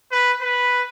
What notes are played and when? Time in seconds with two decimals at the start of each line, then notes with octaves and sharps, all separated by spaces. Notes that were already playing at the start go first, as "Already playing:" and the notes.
0.11 B4
0.41 B4